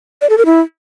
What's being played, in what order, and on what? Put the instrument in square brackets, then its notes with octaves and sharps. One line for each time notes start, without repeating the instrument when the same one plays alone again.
[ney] D5
A4
A#4
E4